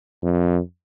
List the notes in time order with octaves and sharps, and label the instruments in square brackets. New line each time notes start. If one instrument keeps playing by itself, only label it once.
[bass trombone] F2